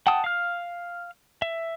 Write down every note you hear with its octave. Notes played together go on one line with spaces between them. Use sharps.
F#5 G5 A5 D#6
F5 F6
E5